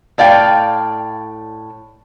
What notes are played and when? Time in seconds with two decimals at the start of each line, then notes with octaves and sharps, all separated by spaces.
0.18 A2 D5 F5 G5